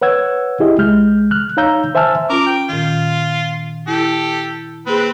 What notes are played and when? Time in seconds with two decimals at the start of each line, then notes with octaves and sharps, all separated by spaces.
0.02 B4 C#5 F#5 E6 G#6
0.60 E4 G4 G#4 D#5
0.78 C2 G#3 F6 G6
1.31 F6 F#6
1.57 D#4 C#5 F5 A#5 E6 G6
1.95 C5 E5 G#5 A5 E6 F6
2.30 C#4 F4 A#4 D6
2.46 G5
2.69 A#2 D#3 F4
3.88 E4 G4 A4
4.87 A#3 C4 G#4 B4